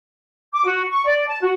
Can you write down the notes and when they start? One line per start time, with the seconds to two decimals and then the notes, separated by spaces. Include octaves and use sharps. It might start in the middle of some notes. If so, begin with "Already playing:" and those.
0.52 D6
0.65 F#4
0.91 C#6
1.06 D5
1.27 A5
1.41 F#4